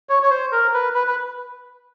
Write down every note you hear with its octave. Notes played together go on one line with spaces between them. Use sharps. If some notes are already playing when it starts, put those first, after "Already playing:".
C#5
C#5
C5
A#4
B4
B4
B4